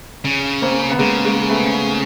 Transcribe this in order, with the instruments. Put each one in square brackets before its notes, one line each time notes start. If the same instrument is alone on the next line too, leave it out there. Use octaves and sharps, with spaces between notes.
[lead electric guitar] C#3
[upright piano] A#3 C4
B3
[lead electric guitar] C#3 [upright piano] G#3 A#3
[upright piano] G#3 A#3
A3 B3